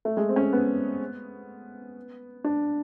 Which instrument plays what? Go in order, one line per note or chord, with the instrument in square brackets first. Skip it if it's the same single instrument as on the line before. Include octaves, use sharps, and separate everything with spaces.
[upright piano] A3
G#3
C4
C#4
C4
B3
D4